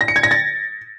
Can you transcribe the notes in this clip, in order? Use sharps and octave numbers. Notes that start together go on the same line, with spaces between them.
A#6
C#7
G#6
A#6
A6